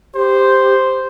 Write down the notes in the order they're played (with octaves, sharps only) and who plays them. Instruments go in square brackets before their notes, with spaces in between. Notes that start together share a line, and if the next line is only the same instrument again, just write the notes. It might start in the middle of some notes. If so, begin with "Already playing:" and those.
[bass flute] G4 [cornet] C5